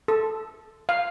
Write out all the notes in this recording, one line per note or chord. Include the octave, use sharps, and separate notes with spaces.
A4
F5